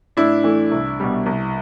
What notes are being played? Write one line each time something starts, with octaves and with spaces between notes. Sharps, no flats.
A2 D4 E4
E3 A3
C2
B2 G3
C2